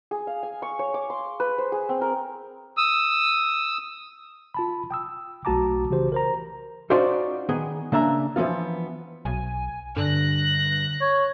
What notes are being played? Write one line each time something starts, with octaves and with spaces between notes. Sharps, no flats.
G#4
F5
G#5
C#6
C#5
D6
C6
B4
C5
G#4
C4
A#4
D#6 E6
F4 A5 B5
G5 D#6 E6
B1 A3 F#4 A5 A#5 D6
C#3 E3 F#4 G4 C5
A#4 C5 A#5
C#4 D#4 F4 F#4 C5 D5
D#3 B3 G#4
C#3 A#3 D4 E5 A#5
E3 F3 G#3 B3 F4
B1 G#5
G2 D3 F#6 A#6
C#5